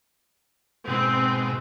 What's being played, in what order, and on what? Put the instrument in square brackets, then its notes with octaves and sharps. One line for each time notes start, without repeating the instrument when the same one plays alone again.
[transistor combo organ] G#2 B2 [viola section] C4